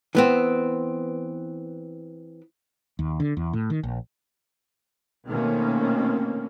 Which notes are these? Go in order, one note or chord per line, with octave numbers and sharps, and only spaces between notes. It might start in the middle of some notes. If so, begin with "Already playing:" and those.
E3 B3 C4
D#2
D3
E2
A2
D#3
A#1
B2 D#3 A3 A#3 C4 C#4